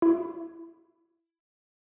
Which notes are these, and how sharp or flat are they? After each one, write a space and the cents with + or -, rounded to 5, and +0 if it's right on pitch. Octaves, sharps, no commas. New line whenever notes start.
E4 +20